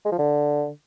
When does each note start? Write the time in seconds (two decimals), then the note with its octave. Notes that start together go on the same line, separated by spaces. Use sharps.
0.05 G#3
0.12 F3
0.18 D3